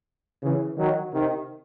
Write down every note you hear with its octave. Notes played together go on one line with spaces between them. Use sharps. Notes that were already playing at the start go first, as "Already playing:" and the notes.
C#3 E3
D#3 F#3
C3 D#3